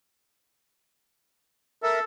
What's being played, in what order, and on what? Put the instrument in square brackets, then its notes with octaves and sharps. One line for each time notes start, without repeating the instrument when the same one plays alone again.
[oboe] A4 [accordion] A#4 E5